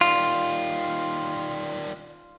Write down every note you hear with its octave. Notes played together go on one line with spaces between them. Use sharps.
D#3 G3 F4